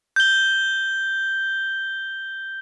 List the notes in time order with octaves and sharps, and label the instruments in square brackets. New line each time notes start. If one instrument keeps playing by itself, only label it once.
[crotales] G6 G7